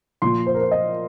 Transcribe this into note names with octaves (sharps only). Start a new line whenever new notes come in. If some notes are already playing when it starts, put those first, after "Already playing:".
A#2 F3 C6
C5
A#4
C5
D#5